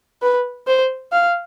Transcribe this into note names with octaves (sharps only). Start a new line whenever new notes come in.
B4
C5
F5